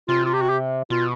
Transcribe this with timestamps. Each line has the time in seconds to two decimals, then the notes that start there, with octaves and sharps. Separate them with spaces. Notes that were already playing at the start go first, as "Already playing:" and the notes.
0.08 C3 F4
0.25 F4
0.33 G4
0.41 F#4
0.50 G4
0.90 B2 F4